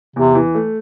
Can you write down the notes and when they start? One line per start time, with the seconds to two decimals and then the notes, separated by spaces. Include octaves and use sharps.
0.16 E2 C3
0.35 E3
0.55 A3